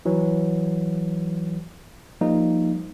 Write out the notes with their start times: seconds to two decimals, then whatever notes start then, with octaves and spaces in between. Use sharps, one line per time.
0.05 E3 F#3
2.21 F3 G3 A#3 D#4